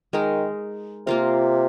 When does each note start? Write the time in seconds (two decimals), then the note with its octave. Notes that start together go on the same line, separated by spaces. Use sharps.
0.13 D#3 G#3 D#4 A#4
1.07 C3 A#3 F4 A#4